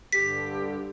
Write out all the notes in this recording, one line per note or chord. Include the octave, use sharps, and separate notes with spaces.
G2 D3 G4 B6